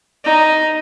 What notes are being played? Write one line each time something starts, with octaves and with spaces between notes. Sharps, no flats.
D#4